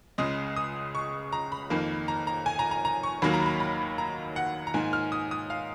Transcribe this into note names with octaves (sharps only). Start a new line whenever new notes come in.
C#2 C#3 G#3 D#6
D#6
C#6
A#5
B5
F2 D#3 A#3
A#5
A#5
G#5
A#5
A#5
A#5
C#6
D#2 D#3 F#3 A#3 B5
A#5
B5
B5
A#5
F#5
A#5
G#2 D#3 A#3 G#5
F6
D#6
D#6
F5